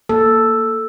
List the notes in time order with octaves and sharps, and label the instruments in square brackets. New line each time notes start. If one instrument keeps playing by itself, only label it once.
[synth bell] A#3 [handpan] A4